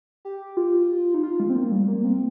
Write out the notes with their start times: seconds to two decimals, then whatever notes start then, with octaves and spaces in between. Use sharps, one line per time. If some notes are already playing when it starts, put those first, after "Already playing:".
0.25 G4
0.57 F4
1.14 D#4
1.23 F4
1.40 G#3
1.50 C4
1.55 A#3
1.72 G3
1.88 A#3
2.04 C4